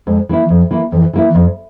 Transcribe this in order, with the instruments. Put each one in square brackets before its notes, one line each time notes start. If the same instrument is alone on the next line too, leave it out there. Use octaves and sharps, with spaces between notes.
[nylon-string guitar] F2 [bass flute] G#3
[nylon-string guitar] E3 A#3 E4
[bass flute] E3
[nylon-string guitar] F2 [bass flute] F3
[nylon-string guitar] E3 A#3 E4
[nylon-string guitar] F2 [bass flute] E3
[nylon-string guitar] E3 A#3 E4
[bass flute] E3
[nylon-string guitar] F2 [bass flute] F3